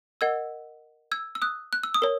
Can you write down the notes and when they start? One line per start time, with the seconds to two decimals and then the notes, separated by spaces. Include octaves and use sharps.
0.21 A#4 D#5 F#5 E6 G#6
1.12 E6 G#6
1.35 E6
1.42 D#6 F#6
1.73 F#6
1.83 E6
1.94 D#6
2.02 A#4 C#5